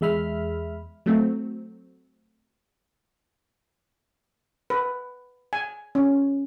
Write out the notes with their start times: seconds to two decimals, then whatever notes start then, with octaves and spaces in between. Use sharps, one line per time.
0.01 E2 G#3 E5 B5 F6
1.06 F#3 A3 C4
4.70 B4
5.53 G#5
5.95 C#4